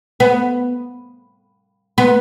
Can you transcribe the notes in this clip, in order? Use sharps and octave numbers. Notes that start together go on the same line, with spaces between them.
B3
B3